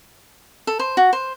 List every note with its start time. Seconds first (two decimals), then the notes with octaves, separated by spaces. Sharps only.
0.67 A4
0.79 C5
0.97 F#4
1.13 C5